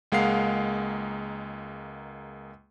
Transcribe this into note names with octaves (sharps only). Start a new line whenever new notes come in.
C#2 G#3 A#3 F5 F#5 C7